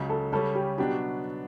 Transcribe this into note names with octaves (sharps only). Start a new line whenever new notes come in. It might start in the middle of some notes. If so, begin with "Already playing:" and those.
Already playing: C#2 C#3 F#3
A4
C#3 G3 C#4 A4
G4
B2 F#3 B3 D4 G4